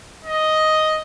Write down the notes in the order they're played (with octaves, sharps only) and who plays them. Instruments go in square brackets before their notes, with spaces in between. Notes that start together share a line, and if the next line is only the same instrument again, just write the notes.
[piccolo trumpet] D#5